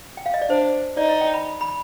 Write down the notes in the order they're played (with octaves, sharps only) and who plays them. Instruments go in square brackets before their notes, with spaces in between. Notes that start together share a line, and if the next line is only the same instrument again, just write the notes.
[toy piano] G5
F5
D#5
D5
[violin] D4 [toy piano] C5
[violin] D#4 [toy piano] D5
[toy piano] D#5
G5
B5
B5